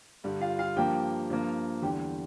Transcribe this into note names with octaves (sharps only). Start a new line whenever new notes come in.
G2 D3 G3
F4 F5
F4 F5
G2 F3 A#3 G4 G5
G2 F3 A#3
E2 D3 G3 G4 G5